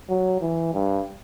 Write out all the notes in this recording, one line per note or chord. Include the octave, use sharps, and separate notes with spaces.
F#3
E3
G2